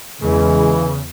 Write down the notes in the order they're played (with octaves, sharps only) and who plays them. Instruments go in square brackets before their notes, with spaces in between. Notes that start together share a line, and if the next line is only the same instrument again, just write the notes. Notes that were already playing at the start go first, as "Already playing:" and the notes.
[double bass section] E2 [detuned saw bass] C#3 [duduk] E3 [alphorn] G#3